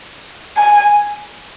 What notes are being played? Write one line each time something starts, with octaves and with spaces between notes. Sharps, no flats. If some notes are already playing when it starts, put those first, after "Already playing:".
G#5